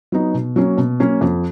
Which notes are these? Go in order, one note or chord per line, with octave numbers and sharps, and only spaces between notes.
F#3 B3 D#4
B2
F#3 A#3 C#4
B2
F#3 A#3 C#4
F2